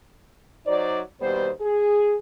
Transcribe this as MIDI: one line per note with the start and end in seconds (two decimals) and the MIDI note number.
0.67 1.00 54
0.67 1.00 63
0.67 1.00 72
0.67 1.00 74
1.21 1.49 39
1.21 1.49 47
1.21 1.49 55
1.21 1.49 59
1.21 1.49 72
1.61 2.16 68